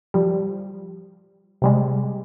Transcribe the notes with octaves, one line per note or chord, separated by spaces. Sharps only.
F3 G3
C3 G3 G#3